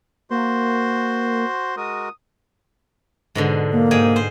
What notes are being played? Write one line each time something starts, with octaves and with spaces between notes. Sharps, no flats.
A#3 F#4 C5 C6
G#3 F#4 A#4 D#6
G#2 B2 D3
A#3
G#2 G#4 G5
C5